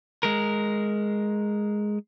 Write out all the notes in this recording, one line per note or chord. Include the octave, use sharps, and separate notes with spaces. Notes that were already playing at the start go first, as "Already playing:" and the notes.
G#3 A#4